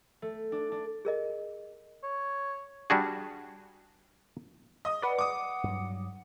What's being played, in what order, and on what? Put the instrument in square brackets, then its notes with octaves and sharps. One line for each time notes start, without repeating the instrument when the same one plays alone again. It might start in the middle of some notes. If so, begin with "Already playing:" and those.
[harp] A3
D4
D4
[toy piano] G#4 A#4 D#5
[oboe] C#5
[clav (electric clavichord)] G3 D4 F#4 G#4
[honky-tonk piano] D#5 D#6
[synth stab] B4 D5 [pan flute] F#5
[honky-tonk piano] D6 D#6
[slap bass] G2 F#3